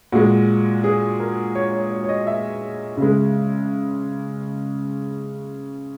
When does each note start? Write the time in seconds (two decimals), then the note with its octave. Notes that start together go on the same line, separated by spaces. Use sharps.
0.12 A#2 G#3 F#4
0.84 G#4
1.20 A#4
1.55 C#5
1.72 C#5
1.90 C#5
2.04 C#5
2.09 D#5
2.27 E5
2.97 C#3 G#3